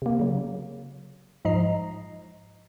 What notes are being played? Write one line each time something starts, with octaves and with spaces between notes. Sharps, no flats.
C3 A#3
C#3 F#3
G#2 F3 D#5 A#5 C7